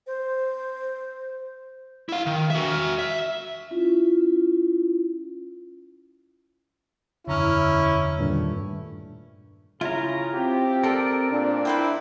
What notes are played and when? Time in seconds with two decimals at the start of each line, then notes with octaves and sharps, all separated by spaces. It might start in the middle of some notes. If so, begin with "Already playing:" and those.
0.07 C5
2.09 E4 F5
2.26 D#3
2.50 F#4 E5
2.99 E5
3.71 C#4 E4 F4
7.27 E1 A#1 F#2 D3 C#4 E4 A#5 F6
8.17 G2 A#2 D#3 A3
9.81 C#3 E4 F4 A#5
10.34 C4 G4
10.83 F4 A4 A#4 D5
11.32 A#2 D4
11.65 E4 B4 C5 G5